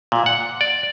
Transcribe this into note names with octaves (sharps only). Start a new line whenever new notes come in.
A#2
F#5
D5